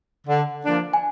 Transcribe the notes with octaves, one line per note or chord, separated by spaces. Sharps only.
D3
F3 A#3 D4
G#5